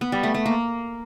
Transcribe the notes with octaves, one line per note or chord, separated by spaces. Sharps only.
B3
G3
A3
A3
A#3